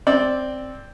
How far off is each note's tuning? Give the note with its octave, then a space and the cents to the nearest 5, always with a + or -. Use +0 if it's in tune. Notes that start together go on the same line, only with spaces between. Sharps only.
C4 +0 D5 +0